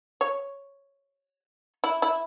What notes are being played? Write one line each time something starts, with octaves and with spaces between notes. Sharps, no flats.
C#5
E4
E4